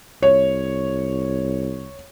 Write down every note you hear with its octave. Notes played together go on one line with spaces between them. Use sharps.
C2 C#5